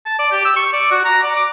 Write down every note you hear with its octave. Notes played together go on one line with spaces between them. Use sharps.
A5
D5
G4
E6
C#6
D5
F#4
A#5
D5
D6